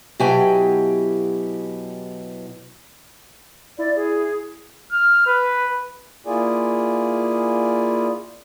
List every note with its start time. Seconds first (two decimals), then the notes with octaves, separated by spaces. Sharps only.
0.20 B2 F#3 E4 G4 G5 G#5
3.78 E4 D5
3.96 G#4
4.92 F6
5.27 B4
6.26 A#3 E4 F4 G#4 D5 G#5